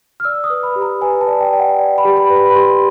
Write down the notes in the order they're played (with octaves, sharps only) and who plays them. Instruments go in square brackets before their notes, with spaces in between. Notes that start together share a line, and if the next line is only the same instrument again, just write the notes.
[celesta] F6
D5 E6
D#6
B4
B5
G4
A#5
B4 G#5
A5
D5
G5
D5 G5
F#5
D5
B5
G4
B5
B4
B5
B5
G4 C6